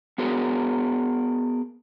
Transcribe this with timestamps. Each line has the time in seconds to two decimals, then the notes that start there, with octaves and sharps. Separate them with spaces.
0.18 B3 F#4 G#4 A#4